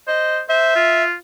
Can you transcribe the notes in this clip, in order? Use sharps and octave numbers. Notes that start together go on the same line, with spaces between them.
C5 D#5
C5 E5
F4